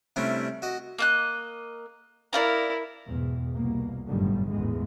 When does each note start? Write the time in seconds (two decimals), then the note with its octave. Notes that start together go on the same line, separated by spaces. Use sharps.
0.16 C3 G3 A3 C#4 D4 E4
0.62 F#4 D#5
0.98 A#3 D#5 F#6
2.33 E4 A#4 D5 F5 A#5
3.08 E2 G#2 B2
3.56 C2 B2 A#3
4.07 G1 F#2 A2 D3 D#3 G3
4.50 A1 E2 G#2 G#3